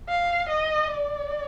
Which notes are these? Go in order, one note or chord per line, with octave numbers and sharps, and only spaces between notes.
F5
D#5
D5